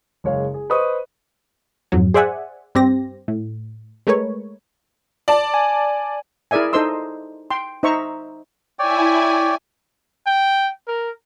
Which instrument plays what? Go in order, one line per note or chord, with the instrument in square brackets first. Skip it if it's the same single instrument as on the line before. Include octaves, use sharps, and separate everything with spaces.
[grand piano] F#1 G#3 C#5 F5
G#4
B4 C5 D#5 C#6 D#6
[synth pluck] F2 G#2 F#3
G#4 C5 D5 E5 F#5 G#5
G2 C4 G4 A#6
A2
G#3 A3 A#4 B4 C#5
[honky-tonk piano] D5 A5
[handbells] G#5
[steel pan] E4 G#4 A#4 D5 E5 G#5
D#4 A4 C5 D#5 C6 E6
G5 C6
D#4 C5 E5 A#5 C#6
[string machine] E4 G#5 [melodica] C#5 D5 G5
[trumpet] G5
A#4